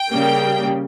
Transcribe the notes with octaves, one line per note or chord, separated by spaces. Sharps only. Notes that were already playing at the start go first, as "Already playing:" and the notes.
Already playing: G5
C#3 G3 A#3